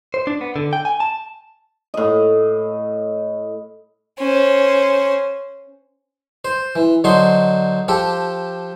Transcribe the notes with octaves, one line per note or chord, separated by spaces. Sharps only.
C5
D4
B3
D3
G5
G#5
A5
A2 D#5
C#4 C5
C5
E3
D3 F#3 D#4 C5 C6
F3 G4 A4